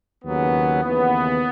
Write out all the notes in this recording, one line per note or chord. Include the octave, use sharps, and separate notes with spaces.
D#2 C#3 F#3 B3
D#2 C#3 E3 B3